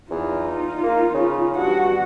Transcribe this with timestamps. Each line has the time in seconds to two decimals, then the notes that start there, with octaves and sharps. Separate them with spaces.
0.11 E2 D#4 F4
0.83 A#3
1.14 C#3
1.57 G2 F#4 F#5